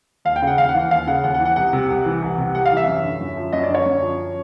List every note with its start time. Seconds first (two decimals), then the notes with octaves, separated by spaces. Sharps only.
0.25 D#2 F5
0.36 G5
0.42 C#3
0.47 F#5
0.58 D#2 F5
0.69 F#5
0.74 E3
0.79 F#5
0.91 D#2 F5
1.07 C#3 F#5
1.24 D#2 F#5
1.34 F#5
1.39 E3
1.45 F#5
1.56 C2 F#5
1.73 C3
1.89 C2
2.05 E3
2.22 C2
2.38 C3
2.54 C2 F#5
2.65 F5
2.71 E3
2.77 E5
2.87 F#2
3.04 D3
3.21 F#2
3.37 F3
3.53 F#2 D#5
3.63 D5
3.69 D3
3.75 C#5
3.86 F#2
4.03 F3